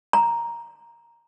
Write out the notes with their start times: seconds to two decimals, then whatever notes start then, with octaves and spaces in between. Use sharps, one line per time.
0.13 A#5